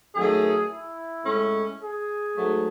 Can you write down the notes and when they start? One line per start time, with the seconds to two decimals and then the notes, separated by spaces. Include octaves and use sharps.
0.14 F#2 D#3 F#3 A3 C#4 G#4
0.70 E4
1.25 A2 G#3 C#4
1.81 G#4
2.36 G#2 F#3 A3